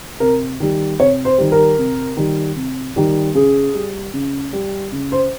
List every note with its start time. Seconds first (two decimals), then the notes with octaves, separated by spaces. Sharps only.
0.20 C3 A#4
0.60 D#3 G3
1.00 C3 C#5
1.25 C5
1.38 D#3 G3
1.52 A#4
1.78 C3
2.17 D#3 G3
2.56 C3
2.96 D#3 G3
3.35 C#3 G#4
3.74 G3
4.13 C#3
4.53 G3
4.92 C#3
5.12 C5